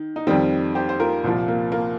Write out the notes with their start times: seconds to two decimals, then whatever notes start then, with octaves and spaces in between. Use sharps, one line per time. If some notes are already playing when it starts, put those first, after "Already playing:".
Already playing: D#3
0.16 D#4
0.27 F2 D#3 G3 C4
0.75 G4 C5
0.89 C5
1.00 F4 A#4
1.24 C2 A#2 F3
1.48 A#3
1.72 A#3